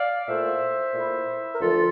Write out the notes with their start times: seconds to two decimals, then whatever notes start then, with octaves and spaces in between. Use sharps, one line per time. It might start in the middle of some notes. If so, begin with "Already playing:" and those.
Already playing: D5 F5
0.28 A#2 A3 E4 C5 E5
0.94 A#2 A3 E4
1.54 A#4
1.59 D2 D3 F3 F4 A4